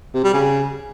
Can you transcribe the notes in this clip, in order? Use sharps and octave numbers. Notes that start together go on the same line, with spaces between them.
C3
G3
C#3